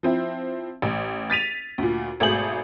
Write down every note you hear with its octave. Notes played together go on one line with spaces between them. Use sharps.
F3 C4 E4
A1
A6 B6 D#7 F7
D2 A#2
G#1 B2 A3 G#4 G6 F#7